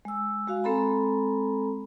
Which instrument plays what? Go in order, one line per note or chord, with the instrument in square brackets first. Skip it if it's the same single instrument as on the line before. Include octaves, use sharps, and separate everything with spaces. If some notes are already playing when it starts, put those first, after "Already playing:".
[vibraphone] G#3 E6
G#3 F#4 F5
G#3 C4 A4 A#5 B5